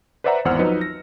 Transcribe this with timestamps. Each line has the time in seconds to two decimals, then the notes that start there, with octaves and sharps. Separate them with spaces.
0.24 B4 C5 D5 E5 F#5 A#5
0.45 G#1 E2 C5 F#5 E6 F6
0.59 F3 F#3 D#4 B4 C#7
0.81 A#6